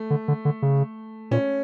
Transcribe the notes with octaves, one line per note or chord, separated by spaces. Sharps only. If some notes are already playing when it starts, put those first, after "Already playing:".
Already playing: A3
D3
D3
D3
C#3
A#2 C#4